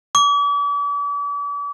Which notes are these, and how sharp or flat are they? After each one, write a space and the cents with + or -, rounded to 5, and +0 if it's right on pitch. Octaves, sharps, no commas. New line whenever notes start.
D6 -40